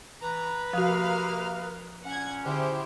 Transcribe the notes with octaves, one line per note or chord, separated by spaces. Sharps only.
E3 B4 A#5
C3 F3 A#3 F#4 F5 D#6 F6
A#2 C#4 F#5 G#6
D3 E4 G4 G#4 C5